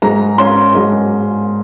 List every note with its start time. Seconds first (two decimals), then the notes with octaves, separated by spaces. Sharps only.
0.02 G#2 A#5
0.38 C#4 C6
0.75 G#2